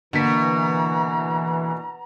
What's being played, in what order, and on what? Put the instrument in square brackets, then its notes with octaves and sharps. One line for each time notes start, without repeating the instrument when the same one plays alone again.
[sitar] B2 [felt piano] D3 A#3 B6 [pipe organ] E3 [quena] A#5